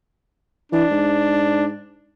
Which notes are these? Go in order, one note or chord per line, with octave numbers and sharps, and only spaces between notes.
E3 D4
G#2